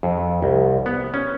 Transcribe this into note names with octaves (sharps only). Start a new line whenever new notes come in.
F2
C2
B3
C#4